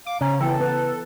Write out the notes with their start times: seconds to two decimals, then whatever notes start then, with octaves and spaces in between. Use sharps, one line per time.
0.06 F5 D6
0.21 C#3 C#4 A#5
0.40 E3 B3 A4 G5
0.60 B3 B4